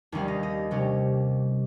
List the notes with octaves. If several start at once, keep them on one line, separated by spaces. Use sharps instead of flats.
D#2 D#3 G3 C#4 F5
D#5
D#5
C3 G3 C#4